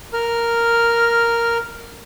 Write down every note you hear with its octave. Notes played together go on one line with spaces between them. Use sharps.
A#4 F6